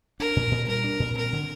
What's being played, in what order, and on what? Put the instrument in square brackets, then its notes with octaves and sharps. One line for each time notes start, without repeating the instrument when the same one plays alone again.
[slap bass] D4 [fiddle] A#4
[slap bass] A#2
A#2
[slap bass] G3 [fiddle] A#4
[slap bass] D4
A#2
[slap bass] C4 [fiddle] A#4
[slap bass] D3